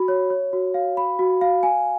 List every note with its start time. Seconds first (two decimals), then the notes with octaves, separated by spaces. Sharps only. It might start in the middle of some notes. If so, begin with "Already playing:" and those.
Already playing: F#4 B5
0.08 C#5
0.30 C#5
0.53 F#4
0.74 F5
0.97 B5
1.19 F#4
1.41 F5
1.63 G#5